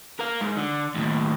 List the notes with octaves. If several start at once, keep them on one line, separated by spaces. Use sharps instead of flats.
A#4 F5
G#2
D3
D#2 A2